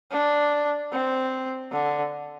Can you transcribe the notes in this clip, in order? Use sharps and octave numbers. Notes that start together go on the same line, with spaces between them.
D4
C4
D3